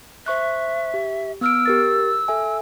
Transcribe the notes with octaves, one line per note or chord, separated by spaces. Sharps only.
C5 E5 C#6 F#6
G4
B3 E6 F6 D7
G4 A#4 A6
A4 E5 G#5